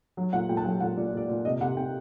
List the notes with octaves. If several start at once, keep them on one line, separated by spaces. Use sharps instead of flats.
F#3
A#2 F#5
A#2 G5
A5
F#3 G5
A#2 F#5
A#2 D5
A#2 D5
A#2
C3 D#5
C3 F#5
C3 G5